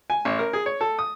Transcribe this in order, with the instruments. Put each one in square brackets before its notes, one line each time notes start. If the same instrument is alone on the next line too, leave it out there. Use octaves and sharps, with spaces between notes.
[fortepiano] G#5
A1
A#4
G#4
C#5
A4
D#6